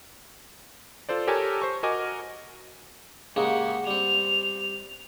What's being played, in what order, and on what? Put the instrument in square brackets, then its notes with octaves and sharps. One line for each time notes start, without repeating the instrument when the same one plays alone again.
[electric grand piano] F4 A4 C5 D5
G4 A4 A#4 C#5 G#5 A5
C5 C#6
F#4 A#4 D#5 G#5 D6
[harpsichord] C#3 G#3 A#3 [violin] G4 F#5
[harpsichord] G3 C4 [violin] F7